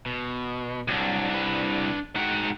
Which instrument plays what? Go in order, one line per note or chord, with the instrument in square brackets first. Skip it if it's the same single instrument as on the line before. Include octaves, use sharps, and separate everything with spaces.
[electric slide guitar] B2
[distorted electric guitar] C2 [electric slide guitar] F#3 D4
[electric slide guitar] D4 B4
[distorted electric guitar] G#2 F#5 [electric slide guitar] D#4 F#4 G5